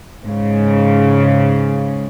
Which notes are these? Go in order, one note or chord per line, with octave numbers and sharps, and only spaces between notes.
G#2 C#3